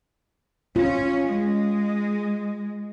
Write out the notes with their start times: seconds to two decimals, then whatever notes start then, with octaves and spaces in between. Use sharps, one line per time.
0.76 C#4 F4
1.24 G#3